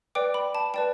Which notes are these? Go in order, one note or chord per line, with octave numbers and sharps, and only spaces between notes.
B4 D5 G5 D6
B5
A5
B4 D5 G5 A5